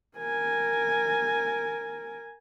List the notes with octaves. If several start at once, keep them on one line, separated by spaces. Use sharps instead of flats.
A#4 G#5